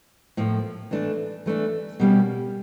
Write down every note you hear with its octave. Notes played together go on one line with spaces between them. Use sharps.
A2 F3 A#3
E3 A3 D4
E3 A3 D4
B2 G3 A#3 C#4